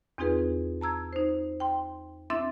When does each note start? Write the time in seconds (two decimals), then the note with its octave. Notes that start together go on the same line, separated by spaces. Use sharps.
0.18 E2 C4 D#4 F4 G#4 B4
0.81 A5 A#5 E6 G#6
1.13 D#4 C5
1.60 G5 C6
2.30 C4 D4 E4 E5 C6 A6